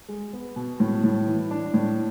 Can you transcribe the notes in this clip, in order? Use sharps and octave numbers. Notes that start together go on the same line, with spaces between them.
G#3
B3
B2
A2
A2
E3
D4
A2